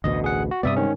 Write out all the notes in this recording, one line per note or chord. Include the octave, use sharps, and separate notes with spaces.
A1 D2 B2 D#5
G#4 F#5
F#4
G2 C3 B3 D5 E5 D#6
G#2 D#3 C#4